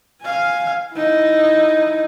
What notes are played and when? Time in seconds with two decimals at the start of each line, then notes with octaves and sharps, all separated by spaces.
0.22 F5 G#5
0.92 D#4 E4